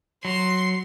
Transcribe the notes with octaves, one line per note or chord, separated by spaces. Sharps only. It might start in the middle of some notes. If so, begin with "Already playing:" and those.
F#3 C6